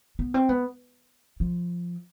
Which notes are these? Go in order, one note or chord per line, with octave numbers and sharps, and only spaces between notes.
B3
C4
B3
F3